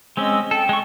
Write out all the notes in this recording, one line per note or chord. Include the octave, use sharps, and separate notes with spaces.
G#3 C4 C#4 D#5 E6
A4 G5
G#3 C#6